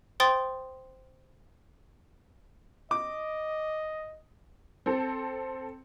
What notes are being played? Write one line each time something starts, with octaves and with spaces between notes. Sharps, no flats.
C5 G5 C6 D#6 A6
D#5 D6
C4 A4